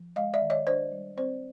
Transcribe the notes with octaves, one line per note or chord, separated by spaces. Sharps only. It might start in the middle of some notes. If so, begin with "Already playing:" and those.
Already playing: F3
G#3 D#5 F5
D5 E5
D#3
C#5 D#5
D4 C5 D5
G3
C4 C5 D5